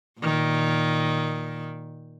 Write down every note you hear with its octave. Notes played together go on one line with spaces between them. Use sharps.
A#2 D#3